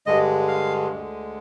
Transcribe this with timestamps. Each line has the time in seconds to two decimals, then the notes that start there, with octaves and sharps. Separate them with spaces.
0.06 G2 D3 G#3 D#5
0.48 F5
0.91 D2 D3 G#3